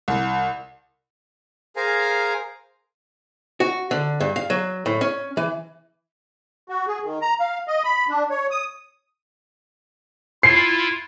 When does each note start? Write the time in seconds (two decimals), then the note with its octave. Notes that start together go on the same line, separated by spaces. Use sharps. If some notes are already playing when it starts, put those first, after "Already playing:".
0.08 C2
1.76 G#4 A#4 C5 F5 G#5 A#5
3.60 F#4
3.91 D3
4.20 G2
4.36 F5
4.50 F#3
4.86 A2
5.01 C#4
5.37 E3
6.69 F#4
6.87 G#4
7.04 D#3
7.22 A#5
7.40 F5
7.68 D#5
7.84 B5
8.09 D4
8.30 C#5
8.51 D#6
10.43 E4 F4 C7